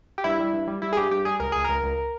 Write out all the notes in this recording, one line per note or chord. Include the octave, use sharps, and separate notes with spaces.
G4
G2 E4
G3
G2
G3
G3 E4
G#4
G2 G4
G2 G4
G3 G#4
C#2 A#4
C#2 G#4
C#2 A#4
C#2